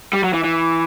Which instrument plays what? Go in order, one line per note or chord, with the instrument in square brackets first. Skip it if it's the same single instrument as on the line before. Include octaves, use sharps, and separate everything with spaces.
[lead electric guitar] G3
F#3
E3
E3